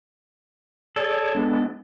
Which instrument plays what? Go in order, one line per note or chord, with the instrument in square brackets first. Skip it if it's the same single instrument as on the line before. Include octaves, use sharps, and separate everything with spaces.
[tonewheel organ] G#4 C#5 D5 [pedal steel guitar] A4
[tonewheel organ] G#3 B3 D4